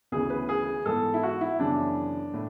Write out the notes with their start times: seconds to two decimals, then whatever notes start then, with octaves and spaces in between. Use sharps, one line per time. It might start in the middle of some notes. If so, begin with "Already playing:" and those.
0.12 D2 C#3 E3 B3 G#4
0.30 B4
0.49 G#4
0.85 G#2 E3 B3 A4
1.14 E4
1.23 F#4
1.41 E4
1.59 F#2 C#3 E3 B3 D4
2.34 A2